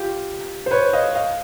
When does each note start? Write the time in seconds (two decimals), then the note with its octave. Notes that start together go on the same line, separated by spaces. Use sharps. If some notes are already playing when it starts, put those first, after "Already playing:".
Already playing: F4 G4
0.66 C5
0.71 B4 C#5
0.93 D#5 F5
1.15 D#5 F5